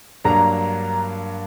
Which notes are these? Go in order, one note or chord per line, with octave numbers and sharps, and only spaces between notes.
G2 F#3 A#3 D4 A#5